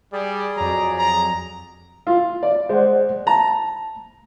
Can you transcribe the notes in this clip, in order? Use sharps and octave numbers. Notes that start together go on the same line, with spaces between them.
G3 G#4 D5
F2 F#3 A#5
A#5
F4 F5
D5
G#3 C5 D5 F#5
A5 A#5